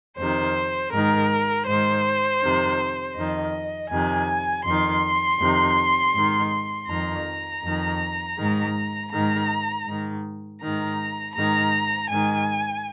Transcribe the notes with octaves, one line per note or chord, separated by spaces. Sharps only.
F2 C3 D#3 C5
G#2 D#3 A#4
G#2 D#3 C5
F2 C3 D#3
F2 D#3 D#5
F2 C3 D#3 G#5
F2 D#3 C6
F2 C3 D#3
G#2 D#3
F2 D#3 A#5
F2 D#3
G#2 D#3
G#2 D#3 A#5
G#2 D#3
G#2 D#3 A#5
G#2 D#3 A#5
G#2 D#3 G#5